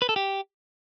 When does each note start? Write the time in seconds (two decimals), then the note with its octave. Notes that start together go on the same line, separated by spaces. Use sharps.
0.02 B4
0.09 A4
0.16 G4